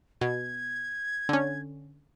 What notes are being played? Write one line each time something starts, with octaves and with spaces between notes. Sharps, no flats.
B2 G#6
D3 C#4